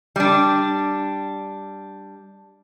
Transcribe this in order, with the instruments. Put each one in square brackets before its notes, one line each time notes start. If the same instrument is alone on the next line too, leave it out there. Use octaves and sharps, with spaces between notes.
[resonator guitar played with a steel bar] G3 D4